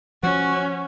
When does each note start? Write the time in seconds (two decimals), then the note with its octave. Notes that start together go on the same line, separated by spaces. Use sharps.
0.23 F3 C#4 F#4